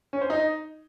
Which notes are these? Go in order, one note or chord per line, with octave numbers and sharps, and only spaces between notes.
C#4
C5
D#4